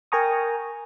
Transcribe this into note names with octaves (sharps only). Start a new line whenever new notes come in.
A#4 G5 G#5 A#5 C#6 D#6